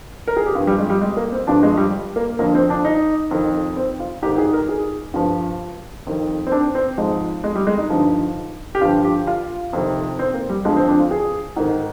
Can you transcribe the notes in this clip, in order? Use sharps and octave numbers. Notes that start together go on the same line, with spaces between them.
A#4
G#4
G4
G2 F3 F4
G3
G#3
G3
G#3
A#3
C4
G2 D3 F3 D4
G#3
G3
A#3
F2 D3 F3 A#3
C4
D4
D#4
F2 D#3
C4
F4
G#2 D#3 G4
G#4
A#4
G#4
G2 F3
F2 D#3
C4
D4
C4
G#2 F3 G#3
G#3
G3
G#3
D#4
G2 D3 F3
G4
G2 D3 F3 F4
G4
F4
F2 C3 D#3
C4
A#3
G3
F2 D3 F3 G#3
C4
D4
F4
G#4
G#2 D#3